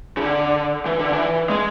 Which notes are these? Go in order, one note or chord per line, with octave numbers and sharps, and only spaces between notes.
C#3
D3
E3
D3
E3
G#3